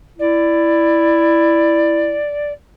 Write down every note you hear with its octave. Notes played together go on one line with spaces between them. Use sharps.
E4 D5